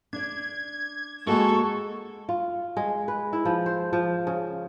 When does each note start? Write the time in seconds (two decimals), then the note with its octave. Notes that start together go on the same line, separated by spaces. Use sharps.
0.13 D4 D5 G#6
1.27 G#3 A#3 F#4 A4 A#4 C#6
2.29 F4
2.77 G#3
3.08 B4
3.33 E4
3.45 F3
3.66 C5
3.93 F3
4.27 C#3